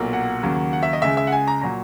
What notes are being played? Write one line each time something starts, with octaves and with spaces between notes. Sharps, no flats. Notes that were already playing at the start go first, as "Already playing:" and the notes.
Already playing: B1 A#2 F#3 A#3
F#5
D#2 C#3 F#3 A#3
F#5
E5
D#5
C#2 C#3 G#3 E5
E5
F#5
G#5
A#5
A#2 F#3 A#5